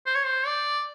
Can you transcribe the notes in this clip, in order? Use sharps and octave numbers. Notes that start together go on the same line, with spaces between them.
C5
C#5
C5
D5